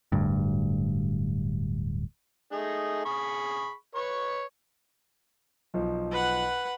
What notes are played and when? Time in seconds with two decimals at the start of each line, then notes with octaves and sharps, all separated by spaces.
0.12 D1 D2 G2
2.52 A3 D#4 G#4
3.05 G#4 B5 C#6
3.95 B4 C#5 C#6
5.74 B1 F3
6.12 B4 F#5